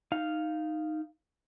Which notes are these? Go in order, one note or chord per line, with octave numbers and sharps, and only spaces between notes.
D#4 F5